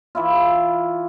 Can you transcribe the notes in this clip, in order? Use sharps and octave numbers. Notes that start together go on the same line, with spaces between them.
E3 E4 F4